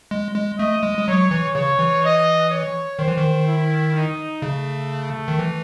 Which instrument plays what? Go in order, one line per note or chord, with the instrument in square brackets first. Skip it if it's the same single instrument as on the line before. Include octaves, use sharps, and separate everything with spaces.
[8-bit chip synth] G#3
G#3
[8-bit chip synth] A3 [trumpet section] D#5
[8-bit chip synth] G#3
G#3
[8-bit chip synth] F#3 [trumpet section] C#5
[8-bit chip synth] E3
[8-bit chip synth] C#3 [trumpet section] C#5
[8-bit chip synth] E3
[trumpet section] D#5
C#5
[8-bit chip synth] D#3 [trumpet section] C5
[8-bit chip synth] E3
D#3
[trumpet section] E4
D#4
[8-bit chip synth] C#3 [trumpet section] A3
[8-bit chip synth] D#3
E3